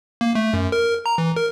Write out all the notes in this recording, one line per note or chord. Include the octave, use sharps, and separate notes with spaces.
A#3
A3
F#2
A#4
A#5
E3
A#4